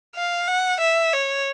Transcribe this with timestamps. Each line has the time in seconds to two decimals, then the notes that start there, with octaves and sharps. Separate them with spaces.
0.16 F5
0.48 F#5
0.80 E5
1.13 C#5